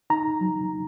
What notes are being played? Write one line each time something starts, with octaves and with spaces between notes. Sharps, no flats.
D#4 A#5
F#3